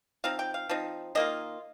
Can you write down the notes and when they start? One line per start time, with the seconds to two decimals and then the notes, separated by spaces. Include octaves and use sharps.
0.24 F3 C4 D#4 F5
0.39 G5
0.54 F5
0.69 F3 C4 D#4
1.15 D#3 A#3 F4 D#5